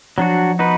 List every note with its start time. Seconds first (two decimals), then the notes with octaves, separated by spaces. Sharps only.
0.18 F3 F#3 D4 F#4
0.59 B3 D#4 F#4 B4